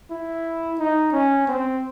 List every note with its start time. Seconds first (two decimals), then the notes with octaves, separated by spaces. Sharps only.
0.11 E4
0.79 D#4
1.12 C#4
1.47 C4